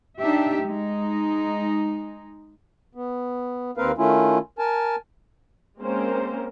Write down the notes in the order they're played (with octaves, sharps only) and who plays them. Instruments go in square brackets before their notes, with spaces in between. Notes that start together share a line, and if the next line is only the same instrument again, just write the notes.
[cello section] D4 D#4 G4 E5
G#3 D#4
[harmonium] B3
D#2 A#3 C4 A#4 B4 F5
D#3 A3 C#4 E4 F4
A#4 G#5 A5
[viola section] G#3 A#3 C4 C#4 A#4 C5